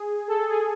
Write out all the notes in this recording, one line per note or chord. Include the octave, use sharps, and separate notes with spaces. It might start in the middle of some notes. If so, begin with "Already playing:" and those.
Already playing: G#4
A4
A4
G#4